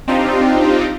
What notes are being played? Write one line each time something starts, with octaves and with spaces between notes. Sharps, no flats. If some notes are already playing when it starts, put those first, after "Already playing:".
C4 D4 D#4 F4 G4